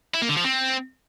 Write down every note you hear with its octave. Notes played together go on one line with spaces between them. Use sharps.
E4
A#3
D3
F3
C4